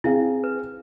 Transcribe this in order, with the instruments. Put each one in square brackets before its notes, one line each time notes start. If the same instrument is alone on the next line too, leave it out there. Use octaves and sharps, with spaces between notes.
[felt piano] C4 G#4 F5 [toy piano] E4
[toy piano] B4